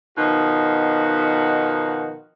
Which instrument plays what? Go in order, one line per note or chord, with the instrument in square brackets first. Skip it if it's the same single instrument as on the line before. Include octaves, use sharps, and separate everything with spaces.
[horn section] B2 D#3 F3 D#4 F#4